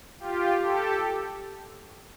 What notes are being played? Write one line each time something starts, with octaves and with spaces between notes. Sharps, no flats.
F4 G4
G4 A4